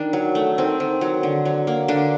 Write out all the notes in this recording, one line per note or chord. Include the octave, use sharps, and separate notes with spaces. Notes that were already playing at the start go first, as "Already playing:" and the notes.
Already playing: D#3 D4
F#3
A3
D#3 C4
D#3
F#3
D3
F#3
A#3
D3 D4